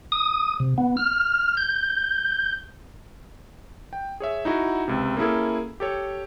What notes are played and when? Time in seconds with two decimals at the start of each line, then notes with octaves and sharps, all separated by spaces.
0.12 D#6
0.60 C3
0.78 B3
0.97 F6
1.57 G6
3.93 G5
4.20 G#4 C#5 E5
4.45 D#4 E4 F#4 F#5
4.88 C#2 C3
5.17 A#3 C#4 E4 G#4 A4
5.80 G4 A4 C#5